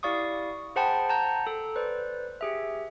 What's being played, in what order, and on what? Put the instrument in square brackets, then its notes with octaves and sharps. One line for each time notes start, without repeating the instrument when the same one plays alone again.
[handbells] E4 G4 D5 F5 C#6 D#6
G#4 C5 F#5 G5 A5 B5
F#5 A5 A#5 G6
A4
B4 C5 D5
G4 G#4 E5